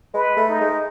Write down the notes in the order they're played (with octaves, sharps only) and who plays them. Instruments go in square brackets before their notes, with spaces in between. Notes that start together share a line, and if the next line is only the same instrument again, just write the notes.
[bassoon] G#3 [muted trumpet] B4
[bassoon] A3
[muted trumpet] D#4
[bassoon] G#3